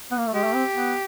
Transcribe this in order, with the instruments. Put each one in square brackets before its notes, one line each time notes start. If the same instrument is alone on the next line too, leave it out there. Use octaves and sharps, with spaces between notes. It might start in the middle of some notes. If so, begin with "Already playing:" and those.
[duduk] B3
A#3
A3
[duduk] G#3 [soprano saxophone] G4
[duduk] A3
C4
B3